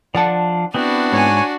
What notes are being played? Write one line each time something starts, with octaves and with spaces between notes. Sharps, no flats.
F3 D4 D5 F#5 A5
B3 C4 D4 E4 F#4
G#2 C#5 G#5